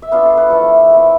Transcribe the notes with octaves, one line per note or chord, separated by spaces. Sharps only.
E5
B3 D4 F4 F5
A4
B4
F3 A3 E4 A4
G#3 C4 E4